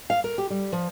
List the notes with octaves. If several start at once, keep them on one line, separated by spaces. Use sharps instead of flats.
F5
A#4
G4
G3
F3